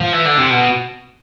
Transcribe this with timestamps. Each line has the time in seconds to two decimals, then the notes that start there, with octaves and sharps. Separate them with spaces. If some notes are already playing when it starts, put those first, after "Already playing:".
0.00 F3
0.13 E3
0.25 D3
0.38 C3
0.50 B2